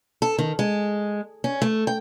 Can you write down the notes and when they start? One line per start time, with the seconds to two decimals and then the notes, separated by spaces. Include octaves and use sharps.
0.22 A4
0.38 D#3
0.59 G#3
1.44 C#4
1.62 A3
1.87 G5